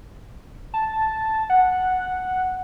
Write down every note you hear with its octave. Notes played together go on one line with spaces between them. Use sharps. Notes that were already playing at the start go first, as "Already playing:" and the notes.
A5
F#5